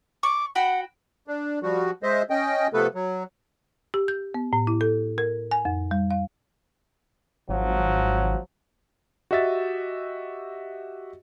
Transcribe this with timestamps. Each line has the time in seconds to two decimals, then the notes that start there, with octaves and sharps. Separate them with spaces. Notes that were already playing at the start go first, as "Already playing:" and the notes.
0.23 C#6 D6
0.55 F#4 F#5 G5 B5
1.27 D4
1.63 F3 G3 F#4
2.03 G#3 C5 D#5 E5
2.30 C#4 D#5 G5
2.73 C3 F3 A3 B3 A4 B4
2.95 F#3
3.94 G4
4.08 G6
4.34 B3
4.53 A2
4.67 E4
4.81 A4
5.18 A#4
5.51 G#5
5.65 F2
5.91 G3
6.11 F5
7.49 G#1 F3 F#3
9.31 F#4 G4 D#5 E5 E6 A6